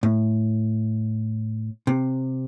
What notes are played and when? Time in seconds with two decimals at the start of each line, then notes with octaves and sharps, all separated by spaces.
0.03 A2
1.87 C3